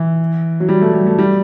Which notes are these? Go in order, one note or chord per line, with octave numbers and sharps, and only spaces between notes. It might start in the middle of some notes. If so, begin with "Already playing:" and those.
Already playing: E3
F#3
G3
A3
G3
A3
G3